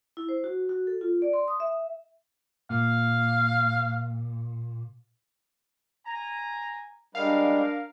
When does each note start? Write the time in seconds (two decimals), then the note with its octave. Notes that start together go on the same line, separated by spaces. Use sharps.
0.17 E4
0.29 C5
0.44 F#4
0.69 F#4
0.87 A4
1.01 F4
1.22 D5
1.33 C6
1.48 D#6
1.60 E5
2.70 A#2 F5
6.06 G#5 A#5
7.15 G3 G#3 D4 A#4 F5